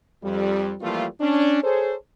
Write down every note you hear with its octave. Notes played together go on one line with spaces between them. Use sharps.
F2 G3
E3 F3 G3 A3 A#3 F4
C#4 D4
G#4 A4 C5 C#5